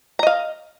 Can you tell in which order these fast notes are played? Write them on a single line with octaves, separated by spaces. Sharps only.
A#5 D#5 F5